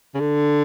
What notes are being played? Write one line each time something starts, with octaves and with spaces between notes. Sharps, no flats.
C#3
D3